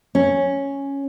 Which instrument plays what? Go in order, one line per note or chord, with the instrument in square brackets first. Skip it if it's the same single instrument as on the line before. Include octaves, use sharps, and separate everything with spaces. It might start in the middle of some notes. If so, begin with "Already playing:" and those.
[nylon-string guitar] C#4